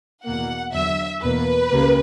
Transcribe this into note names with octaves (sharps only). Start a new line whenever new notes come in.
E2 B2 A#3 F#5
E2 D3 F#3 E5
E2 B2 A#3 B4
C#2 C#3 G3 A#3